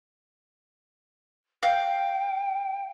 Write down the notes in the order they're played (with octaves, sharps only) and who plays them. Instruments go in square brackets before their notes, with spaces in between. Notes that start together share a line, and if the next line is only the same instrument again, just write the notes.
[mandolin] F5 G6 [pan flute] G5